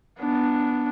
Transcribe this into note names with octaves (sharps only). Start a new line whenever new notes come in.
B3 D4